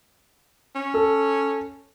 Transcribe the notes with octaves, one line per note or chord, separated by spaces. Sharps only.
C#4
A4